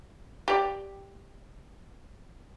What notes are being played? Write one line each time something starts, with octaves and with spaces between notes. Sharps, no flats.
G4 D5